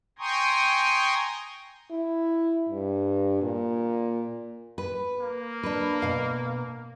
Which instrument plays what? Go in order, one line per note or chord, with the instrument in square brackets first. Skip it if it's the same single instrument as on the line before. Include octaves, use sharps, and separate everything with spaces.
[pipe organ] G5 G#5 A#5 C6 C#6 D#6
[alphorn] E4
G2
A#2
[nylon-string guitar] B4
[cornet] A#3
[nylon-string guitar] D4 B4
B2 F5